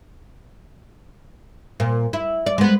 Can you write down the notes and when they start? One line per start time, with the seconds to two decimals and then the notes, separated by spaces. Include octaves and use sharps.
1.80 A#2
2.13 E4
2.46 D5
2.58 G#3 B3